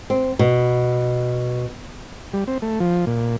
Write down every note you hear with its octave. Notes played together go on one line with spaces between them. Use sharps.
C4
B2
G3
C4
A3
F3
A#2